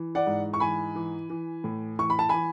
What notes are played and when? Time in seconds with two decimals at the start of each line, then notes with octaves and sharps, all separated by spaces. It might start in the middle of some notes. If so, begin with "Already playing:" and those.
Already playing: E3
0.15 D5 F#5
0.26 G#2
0.54 C#6
0.60 E3 G#5 B5
0.95 E3
1.30 E3
1.64 A2
1.99 E3 C#6
2.10 B5
2.19 A5
2.29 E3 G#5 B5